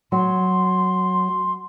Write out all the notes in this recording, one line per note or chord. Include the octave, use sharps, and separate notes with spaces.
F#3 C6